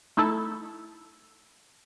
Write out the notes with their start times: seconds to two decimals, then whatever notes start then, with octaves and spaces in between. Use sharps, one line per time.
0.17 A3 D#4 E4 A4